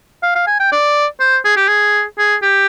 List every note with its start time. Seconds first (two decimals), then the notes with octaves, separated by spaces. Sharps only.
0.23 F5
0.35 F5
0.47 G#5
0.60 G5
0.72 D5
1.20 C5
1.45 G#4
1.56 G4
1.68 G#4
2.18 G#4
2.43 G4